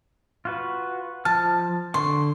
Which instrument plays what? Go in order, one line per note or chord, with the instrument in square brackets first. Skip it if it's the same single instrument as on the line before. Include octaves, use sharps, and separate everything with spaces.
[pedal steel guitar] F4 F#4 B4
[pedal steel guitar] F3 F6 [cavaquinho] A5
[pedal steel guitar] D3 C#6 [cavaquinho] C6